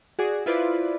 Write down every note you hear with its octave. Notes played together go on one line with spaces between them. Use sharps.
F#4 G#4 D5
E4 F4 B4 C5 D5